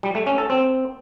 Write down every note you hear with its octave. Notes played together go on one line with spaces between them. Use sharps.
G3
A3
C#4
A4
C4